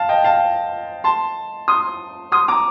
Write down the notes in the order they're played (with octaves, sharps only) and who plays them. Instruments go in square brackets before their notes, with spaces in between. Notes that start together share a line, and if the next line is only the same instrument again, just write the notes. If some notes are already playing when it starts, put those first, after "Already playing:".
Already playing: [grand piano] F5 A5
D#5 G5
F5 A5
A5 C6
C6 D#6
C6 D#6
A#5 D6